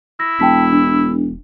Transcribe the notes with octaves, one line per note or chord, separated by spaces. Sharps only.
E4 A#6
E1 G5 A5 B6
D4